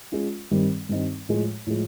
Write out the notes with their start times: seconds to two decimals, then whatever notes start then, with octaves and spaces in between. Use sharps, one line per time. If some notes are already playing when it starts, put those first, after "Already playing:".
0.12 G#3 C#4 F4
0.51 G2 D#3 G3 C4 D#4
0.89 G2 D#3 G3 C4 D#4
1.29 A2 F3 G#3
1.67 A2 F3 G#3